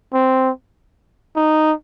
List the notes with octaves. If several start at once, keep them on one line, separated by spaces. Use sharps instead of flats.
C4
D#4